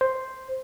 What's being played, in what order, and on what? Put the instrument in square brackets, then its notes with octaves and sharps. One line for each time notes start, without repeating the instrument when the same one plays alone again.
[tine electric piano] C5